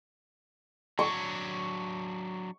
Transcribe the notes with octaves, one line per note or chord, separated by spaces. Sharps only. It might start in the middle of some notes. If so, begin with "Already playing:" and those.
F#3 D4 C#6